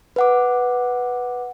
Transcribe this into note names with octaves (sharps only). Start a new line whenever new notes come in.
B4 F#5 D6